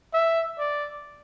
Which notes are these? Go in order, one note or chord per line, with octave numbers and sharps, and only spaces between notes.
E5
D5